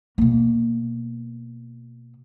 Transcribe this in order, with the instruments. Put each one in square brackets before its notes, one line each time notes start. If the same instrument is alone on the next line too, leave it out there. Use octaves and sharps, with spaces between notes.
[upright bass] B2 A#3